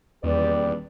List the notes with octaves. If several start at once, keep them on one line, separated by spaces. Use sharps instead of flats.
D#1 E2 G4 B4 D5